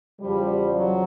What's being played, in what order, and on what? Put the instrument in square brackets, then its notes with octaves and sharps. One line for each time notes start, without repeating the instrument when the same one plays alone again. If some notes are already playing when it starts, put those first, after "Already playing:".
[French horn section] E2 C#3 F3 G3
F#3